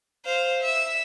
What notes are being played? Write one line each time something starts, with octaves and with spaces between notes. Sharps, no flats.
C5 F5
E5